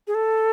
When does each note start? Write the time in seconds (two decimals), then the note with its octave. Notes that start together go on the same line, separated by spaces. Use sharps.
0.07 G#4
0.15 A4